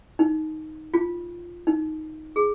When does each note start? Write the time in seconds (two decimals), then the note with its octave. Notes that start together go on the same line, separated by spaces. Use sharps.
0.19 D#4
0.94 F4
1.67 D#4
2.36 G#4